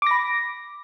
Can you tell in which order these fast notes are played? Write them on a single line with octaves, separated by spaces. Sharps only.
D6 A#6 B5